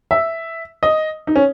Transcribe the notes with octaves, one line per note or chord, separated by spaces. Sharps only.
E5
D#5
D#4
C#4